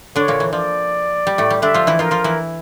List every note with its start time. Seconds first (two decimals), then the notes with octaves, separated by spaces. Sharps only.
0.16 D3 D4 C#5
0.28 A#2 A#3
0.40 E3
0.52 F3 D5
1.27 G3
1.38 A2 A3
1.50 G3
1.62 D3 D4 E5
1.74 F3 F4
1.87 E3 E4
1.99 F3 F4 A#4
2.11 F3 F4
2.24 E3 E4